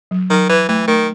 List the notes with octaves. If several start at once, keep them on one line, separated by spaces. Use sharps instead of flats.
F#3
D#3 F#3
E3 B4
E3 A3
D#3 A3